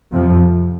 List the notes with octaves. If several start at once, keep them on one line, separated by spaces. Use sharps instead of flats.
F2 C3 F3